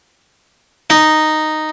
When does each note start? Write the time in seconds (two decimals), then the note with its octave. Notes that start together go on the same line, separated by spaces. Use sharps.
0.90 D#4